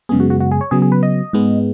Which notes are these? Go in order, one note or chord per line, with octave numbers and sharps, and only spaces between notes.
F#2 C#3 G#3 B3 G#4
F#4
F#4
F#4
G#4
C#5
C#3 F#3 B3 G#4
G#4
B4
D#5
G#2 G#3 B3